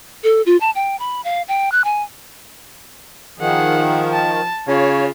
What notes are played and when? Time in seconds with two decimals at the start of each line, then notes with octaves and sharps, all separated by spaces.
0.24 A4
0.46 F4
0.61 A5
0.75 G5
0.99 B5
1.24 F5
1.48 G5
1.72 F#6
1.84 G#5
3.40 D#3 F3 G#4 F#5
4.14 A5
4.68 C#3 F4 C#5